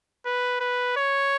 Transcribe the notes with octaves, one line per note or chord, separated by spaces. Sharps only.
B4
B4
C#5